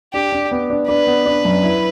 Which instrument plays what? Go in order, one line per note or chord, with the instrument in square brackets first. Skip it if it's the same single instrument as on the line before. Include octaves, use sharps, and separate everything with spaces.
[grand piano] D4 [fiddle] G4
[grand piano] D4
B3
D4
[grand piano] D4 [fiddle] B4
[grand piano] B3
D4
F#2
E4